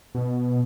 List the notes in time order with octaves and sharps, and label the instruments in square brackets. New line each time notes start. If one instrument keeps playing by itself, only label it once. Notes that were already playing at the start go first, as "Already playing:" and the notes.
[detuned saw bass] B2